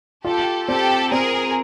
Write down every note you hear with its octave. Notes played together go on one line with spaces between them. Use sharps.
F4 G4 A4
C4 G4 A4
C4 G#4 A#4